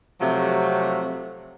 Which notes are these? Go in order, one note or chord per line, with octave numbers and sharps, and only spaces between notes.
C3 F3 F#3 A3